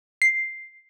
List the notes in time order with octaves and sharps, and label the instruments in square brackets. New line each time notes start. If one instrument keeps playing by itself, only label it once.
[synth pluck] C7